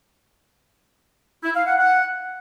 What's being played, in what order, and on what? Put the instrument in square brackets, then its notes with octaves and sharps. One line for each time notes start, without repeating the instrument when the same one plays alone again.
[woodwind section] E4
F5
F#5
F#5